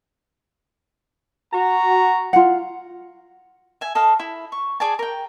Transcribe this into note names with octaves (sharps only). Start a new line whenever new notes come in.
F#4 A#5
F4 F#5
E5 G#5
A4 D#5 F5
E4
C#6
G#4 D5 G#5 A5
A#4 G5